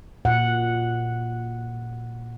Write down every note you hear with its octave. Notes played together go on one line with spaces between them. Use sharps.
A#2 F#5